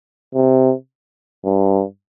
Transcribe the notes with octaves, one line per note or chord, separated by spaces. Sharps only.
C3
G2